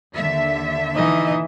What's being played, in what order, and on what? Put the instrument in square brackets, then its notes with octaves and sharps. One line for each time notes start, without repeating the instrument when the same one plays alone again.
[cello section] D#2 D3 E5
[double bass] E3 [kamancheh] D#4 D#5